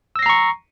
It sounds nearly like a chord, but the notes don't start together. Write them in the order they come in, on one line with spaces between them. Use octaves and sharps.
E6 A#6 C7 A#5 C#6